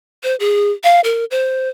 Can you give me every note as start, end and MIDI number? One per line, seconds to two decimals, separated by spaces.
0.23 0.35 72
0.40 0.72 68
0.84 1.00 77
1.04 1.25 70
1.31 1.69 72